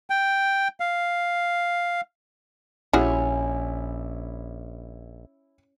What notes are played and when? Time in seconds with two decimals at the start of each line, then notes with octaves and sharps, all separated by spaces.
0.10 G5
0.80 F5
2.93 A#1 G3 C#4 E4 F#4 G#4